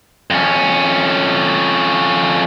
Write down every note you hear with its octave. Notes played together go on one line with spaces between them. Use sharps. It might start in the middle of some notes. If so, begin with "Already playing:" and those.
F2 C#4